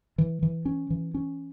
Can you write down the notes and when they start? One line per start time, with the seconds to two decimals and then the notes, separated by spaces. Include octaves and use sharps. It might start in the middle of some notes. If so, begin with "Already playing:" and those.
0.18 E3
0.43 E3
0.65 C#4
0.90 E3
1.14 C#4